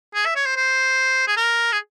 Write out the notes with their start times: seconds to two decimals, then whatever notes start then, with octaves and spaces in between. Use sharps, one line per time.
0.15 G#4
0.26 E5
0.36 C#5
0.46 C5
0.56 C5
1.28 G#4
1.37 A#4
1.72 G#4